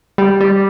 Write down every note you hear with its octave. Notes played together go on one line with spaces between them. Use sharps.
G3
G3